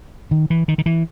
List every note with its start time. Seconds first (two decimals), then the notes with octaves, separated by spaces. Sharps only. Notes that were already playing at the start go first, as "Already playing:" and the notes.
0.31 D#3
0.50 E3
0.68 D#3
0.78 D#3
0.86 E3